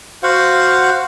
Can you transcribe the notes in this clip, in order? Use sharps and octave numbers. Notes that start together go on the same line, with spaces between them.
F#4 C5 F5 F#5